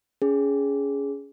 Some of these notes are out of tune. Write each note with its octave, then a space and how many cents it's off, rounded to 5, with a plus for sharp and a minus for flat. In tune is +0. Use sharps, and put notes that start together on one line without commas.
C#4 +25 G#4 +0